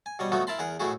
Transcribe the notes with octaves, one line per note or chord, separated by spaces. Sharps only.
G#5
B2 G3 C#5 D#5
F3 F#3 A3 B3 D#4 F#4
E4 A#4 F5 A5 B5 C6
E2 G#4 A#4 F#5
B1 A2 A3 E4 F#4 G#4